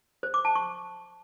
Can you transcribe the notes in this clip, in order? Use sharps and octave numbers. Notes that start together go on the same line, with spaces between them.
C5
D6
A5
C#6